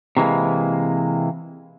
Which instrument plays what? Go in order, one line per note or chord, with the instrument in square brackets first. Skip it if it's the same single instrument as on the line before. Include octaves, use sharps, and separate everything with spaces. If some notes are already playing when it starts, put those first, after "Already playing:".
[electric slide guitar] C3 E3 G#3 A#3